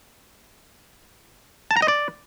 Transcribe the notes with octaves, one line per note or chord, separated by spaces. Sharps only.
A5
A#5
D#5
D5